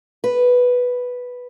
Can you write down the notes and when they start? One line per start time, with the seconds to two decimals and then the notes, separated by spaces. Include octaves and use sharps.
0.24 B4